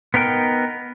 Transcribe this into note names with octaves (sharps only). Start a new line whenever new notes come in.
B3 D#4 A#4 G5